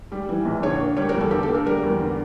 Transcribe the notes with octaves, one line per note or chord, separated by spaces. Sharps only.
G3
E3
A#1
D3 C#5
A#3
G3 C#5
A#4
E2
A4
D3 G4
A4
A#3
A#4
G3 A#4
E2
D3